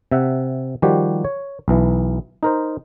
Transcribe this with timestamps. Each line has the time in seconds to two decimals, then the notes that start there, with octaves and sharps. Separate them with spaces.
0.12 C3 E5 F#5
0.82 D#3 F3 G3 F#4 G4
1.25 C#5
1.68 B1 E3
2.43 D#4 A#4 C5